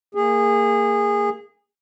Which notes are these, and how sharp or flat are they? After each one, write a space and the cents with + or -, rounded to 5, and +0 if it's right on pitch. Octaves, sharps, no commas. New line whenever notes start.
A#3 -25 G#4 -20